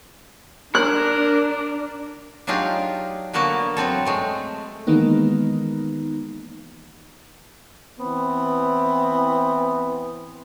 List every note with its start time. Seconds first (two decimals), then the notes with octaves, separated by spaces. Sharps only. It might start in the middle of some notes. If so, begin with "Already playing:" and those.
0.75 D4 A#4 F#6
2.47 F#3 D4 D#4 F4 G4 G#4
3.33 D3 A#3 B3 F#4 A5
3.77 F#3 B3 C4 A4
4.05 G#3 A3 C4
4.87 D#3 E3 G#3 A#3 B3 D#4
7.99 E3 B3 C4